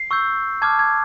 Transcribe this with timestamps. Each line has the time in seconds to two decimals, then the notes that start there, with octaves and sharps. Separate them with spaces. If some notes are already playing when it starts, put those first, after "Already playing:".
Already playing: C7
0.11 C#6 E6 G6
0.62 A5 D6 F6 G#6
0.79 G#6